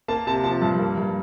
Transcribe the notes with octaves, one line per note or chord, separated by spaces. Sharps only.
A#3 A5
C3 A5
F3 A5
G2
A#3
G2